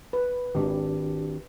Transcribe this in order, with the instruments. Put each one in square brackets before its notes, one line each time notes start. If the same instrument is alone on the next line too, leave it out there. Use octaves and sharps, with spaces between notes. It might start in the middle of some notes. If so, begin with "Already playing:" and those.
[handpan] B4
[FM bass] G#1 [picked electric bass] G#2 D#3 [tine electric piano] D4 G4